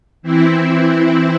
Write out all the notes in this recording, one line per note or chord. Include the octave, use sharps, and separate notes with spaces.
E3 C4 E4